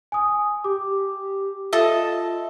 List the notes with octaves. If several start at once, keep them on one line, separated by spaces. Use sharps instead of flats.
G#5 D#6
G4 D6
F4 A4 D#5 E5 A5